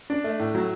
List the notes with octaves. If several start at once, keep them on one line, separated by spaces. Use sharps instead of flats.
D4
A3
A2
F#3